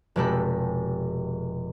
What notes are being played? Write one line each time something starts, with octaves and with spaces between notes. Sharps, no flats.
F1 B2 G#3 G4 A4 B5